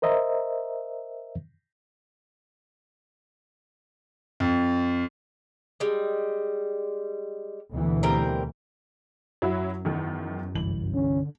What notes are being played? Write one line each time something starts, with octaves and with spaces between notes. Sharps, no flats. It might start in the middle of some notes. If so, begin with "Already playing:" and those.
A#4 C5 D#5 E5 A#5
F2
G3 G#3
D2 B2 E3
G3 C4 A#4
F#2 F#3 E4 F#4
E2 D#3
G1 C2 E3 F#7
D3 C#4